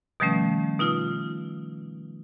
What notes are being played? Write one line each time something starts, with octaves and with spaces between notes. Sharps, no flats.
B2 D#3 F3 G3 A3 C#4
B2 D#4 F4 D#6 E6